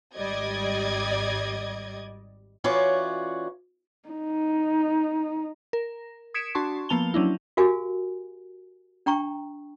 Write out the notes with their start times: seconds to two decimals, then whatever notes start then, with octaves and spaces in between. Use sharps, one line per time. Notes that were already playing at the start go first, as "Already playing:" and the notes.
0.16 G#1 G3 D5 D#5 G#6
2.64 E3 C#4 F4 F#4 C#5 D5
4.09 D#4
5.73 A#4
6.34 D#6 G#6 B6 C#7 D7 E7
6.55 D4 F#4 A5 C6 C#6
6.89 F3 A#3 B3 A5 F7 G7
7.14 F#3 C#4 D4 E4
7.57 F#4 G4 A#4 F5 G#5
9.06 D4 G5 A#5 C#6